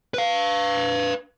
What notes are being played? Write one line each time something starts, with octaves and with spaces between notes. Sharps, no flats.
B4 F5